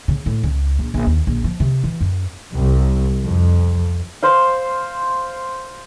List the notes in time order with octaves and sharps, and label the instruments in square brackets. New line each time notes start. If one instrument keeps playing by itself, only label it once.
[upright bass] C#3
A2
C#2
A#1
A#1
D#2
A#1
F3
C3
E3
F#2
[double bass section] C2
F2
[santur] C5 F5